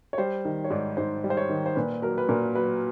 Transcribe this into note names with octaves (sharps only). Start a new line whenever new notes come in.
C#5
G3 C5
D#3
C#5
G#2 D5
G#2 C5
G3
C5
C#5
D#3
C5
A#2 B4
F#3 A#4
B4
A#2 A#4
F#3 B4